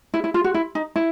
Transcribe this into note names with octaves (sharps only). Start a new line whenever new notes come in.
E4
E4
F4
F#4
E4
D#4
E4